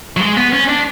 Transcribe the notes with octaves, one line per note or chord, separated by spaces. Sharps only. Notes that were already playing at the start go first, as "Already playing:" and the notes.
F#3
G#3
B3
C#4
D4